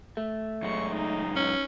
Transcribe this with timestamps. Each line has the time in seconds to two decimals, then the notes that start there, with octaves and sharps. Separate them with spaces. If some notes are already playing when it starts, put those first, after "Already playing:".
0.17 A3
0.63 F#2 G#3 C#6
0.93 D#4
1.36 C#4